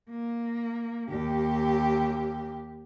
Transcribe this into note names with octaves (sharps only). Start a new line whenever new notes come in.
A#3
D#2 G4